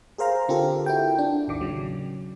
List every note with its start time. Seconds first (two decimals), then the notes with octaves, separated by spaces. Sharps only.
0.18 G#4 A#4 C5 F5 A#5
0.49 D3 C4 F4 G4 A4 A#4
0.86 E4 F#4 G5
1.19 D4
1.47 A1 D#2 D#3 D6
1.61 C#3 F#3